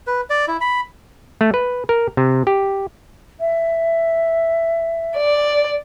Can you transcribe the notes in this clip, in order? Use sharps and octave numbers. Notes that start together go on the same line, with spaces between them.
B4
D5
E4
B5
A3
B4
A#4
C3
G4
E5
D5